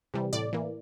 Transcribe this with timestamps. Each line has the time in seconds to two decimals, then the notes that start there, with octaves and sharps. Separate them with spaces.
0.14 C3 E3 G3
0.33 A2 D5
0.53 E3 A#3